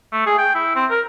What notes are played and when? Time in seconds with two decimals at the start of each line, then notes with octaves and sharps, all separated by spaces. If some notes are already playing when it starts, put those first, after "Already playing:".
0.12 A3
0.27 G#4
0.38 G5
0.55 E4
0.76 C4
0.90 A#4